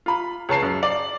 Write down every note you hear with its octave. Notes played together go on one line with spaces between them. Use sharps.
F4 B5
C#2 C#5 A5 C7
F#2
D5